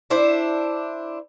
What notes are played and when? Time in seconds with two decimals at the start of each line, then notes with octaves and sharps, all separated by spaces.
0.10 D4 E4 C5